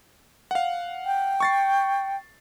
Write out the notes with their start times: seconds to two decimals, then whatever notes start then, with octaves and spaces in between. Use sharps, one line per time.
0.51 F5 F#5
1.06 G5
1.40 C#6 A6 C7